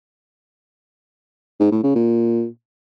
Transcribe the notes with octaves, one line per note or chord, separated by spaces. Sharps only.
G#2
A2
C#3
A#2